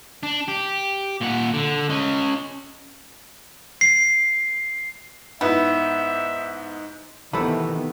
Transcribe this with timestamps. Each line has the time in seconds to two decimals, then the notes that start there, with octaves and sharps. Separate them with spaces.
0.23 D4
0.48 G4
1.21 A#2 F#5
1.54 D3
1.90 C#4 D#5
3.81 C7
5.41 G#2 B3 D#4 E4 E5
7.33 C3 D#3 E3 A3 B3 B4 B5